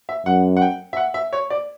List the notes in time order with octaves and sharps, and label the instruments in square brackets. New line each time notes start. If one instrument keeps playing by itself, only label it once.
[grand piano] E5
[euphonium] F#2 [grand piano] F#5
[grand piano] F#5
G5
E5
F#5
E5
C#5
D5